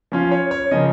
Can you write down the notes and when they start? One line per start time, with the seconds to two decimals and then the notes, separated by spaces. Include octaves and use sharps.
0.12 F3 C#4 F4
0.31 C#5
0.51 C#5
0.71 C#3 F3 A#3 D#5